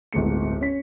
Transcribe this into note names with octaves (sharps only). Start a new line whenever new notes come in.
D1 G1 G#2 A3 C#7
C#4 B6